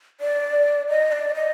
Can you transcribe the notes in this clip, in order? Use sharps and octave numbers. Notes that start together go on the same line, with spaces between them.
D5
D#5
D5
D#5